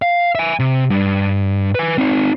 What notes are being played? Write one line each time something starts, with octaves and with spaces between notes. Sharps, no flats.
F5
E5 G#5
C3
G2
B4 G#5
C4 D#4